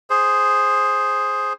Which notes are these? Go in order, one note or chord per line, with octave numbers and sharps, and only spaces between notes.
G#4 C5